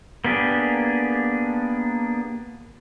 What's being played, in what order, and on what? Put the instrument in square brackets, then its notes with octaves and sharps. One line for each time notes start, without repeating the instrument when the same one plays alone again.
[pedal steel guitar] A#3 B3 D4 G4 G#4